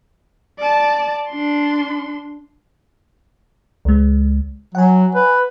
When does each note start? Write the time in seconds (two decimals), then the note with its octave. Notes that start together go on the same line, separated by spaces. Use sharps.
0.59 D5 A5
1.30 D4 C6
3.85 C#2 G#3
4.75 F#3 F#5 G#5
5.15 B4